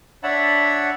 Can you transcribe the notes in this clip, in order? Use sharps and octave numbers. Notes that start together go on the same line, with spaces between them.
D4 C#5 E5 F#5 A5 B5